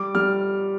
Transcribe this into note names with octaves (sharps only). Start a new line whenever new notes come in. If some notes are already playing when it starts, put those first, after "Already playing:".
Already playing: G3 D6
G3 F6